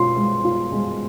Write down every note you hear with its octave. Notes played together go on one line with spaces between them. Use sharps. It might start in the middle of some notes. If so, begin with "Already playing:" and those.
Already playing: B2 F4 C6
G#3
F4
G#3